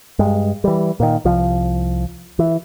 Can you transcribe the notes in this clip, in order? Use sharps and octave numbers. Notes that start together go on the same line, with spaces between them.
G2 G#3
E3 G3
A#2 D#3
C2 F3
E3